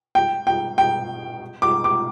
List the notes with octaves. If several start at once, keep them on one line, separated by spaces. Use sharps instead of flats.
G5
G5
G5
D6
D6